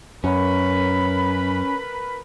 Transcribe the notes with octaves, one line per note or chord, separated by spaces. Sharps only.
F#2 C#4 A#4 B4 B5